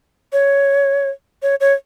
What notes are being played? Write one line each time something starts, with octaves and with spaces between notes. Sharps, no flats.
C#5
C#5
C#5